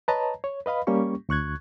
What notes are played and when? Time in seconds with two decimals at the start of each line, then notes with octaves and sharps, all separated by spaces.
0.08 B4 C#5 D#5 A5 A#5
0.44 C#5
0.66 B4 D#5 F5 B5
0.87 G3 A#3 C#4 G4 C#6
1.29 D2 C#6 F#6 G#6